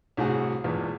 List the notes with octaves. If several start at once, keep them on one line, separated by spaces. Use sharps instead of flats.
C2 A2 F#4 G#4 F#5
B1 E2 A#2 G#3